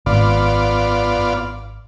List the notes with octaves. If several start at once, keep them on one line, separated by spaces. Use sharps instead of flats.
G#1 F#2 B3 F4 D5